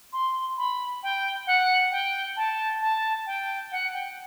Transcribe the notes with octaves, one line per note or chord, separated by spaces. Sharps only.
C6
B5
G5
F#5
G5
A5
A5
G5
F#5
G5